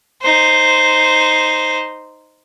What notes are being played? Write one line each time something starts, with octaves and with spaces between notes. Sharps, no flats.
D#4 C5